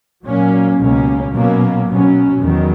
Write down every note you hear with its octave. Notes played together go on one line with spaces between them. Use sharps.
A#2 F#3 A#3 C#4
C#2 B2 A#3 C#4
B2 F#3 A#3 C#4
B2 F#3 C#4
E2 D#3 F#3